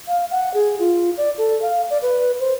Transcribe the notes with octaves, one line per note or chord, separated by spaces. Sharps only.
F5
F#5
G#4
F4
D5
A4
F5
D5
B4
C5